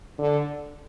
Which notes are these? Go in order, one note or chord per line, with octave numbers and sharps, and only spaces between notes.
D3